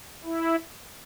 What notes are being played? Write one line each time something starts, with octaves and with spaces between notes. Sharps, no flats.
E4